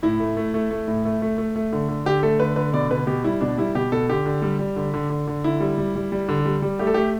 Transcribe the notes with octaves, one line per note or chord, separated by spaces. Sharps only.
A2 E4
A3
A3
A3
A3
A2
A3
A3
A3
A3
D3
D3
D3 G4
A3 A4
D3 B4
D3 B4
B2 D5
B2 B4
B2 G4
G3 E4
B2 D4
G3 E4
B2 G4
B2 A4
D3 G4
D3
G3
G3
D3
D3
D3
D3
D3 E4
G3
G3
G3
G3
D3
G3
G3
A3 G4
A4
A3 G4